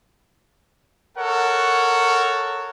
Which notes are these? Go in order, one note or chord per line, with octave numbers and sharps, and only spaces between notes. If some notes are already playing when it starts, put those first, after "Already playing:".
A4 A#4 C#5 F#5